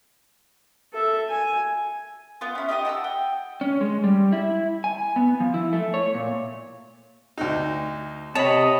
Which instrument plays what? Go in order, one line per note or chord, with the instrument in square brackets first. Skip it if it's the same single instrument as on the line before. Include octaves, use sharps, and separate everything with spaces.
[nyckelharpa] A4 E5
G#5
[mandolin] B3 F4
C#4 E4
D#4 G4 D#5 D#6
F#5 A5 D#6 E6
G5
[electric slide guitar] C#4
G#3
G3
E4
G#5
B3
F3
E4
A3
C#5
A#2
[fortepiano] D2 D#4
[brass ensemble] C3 D#5 [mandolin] C#5 [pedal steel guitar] A5 B5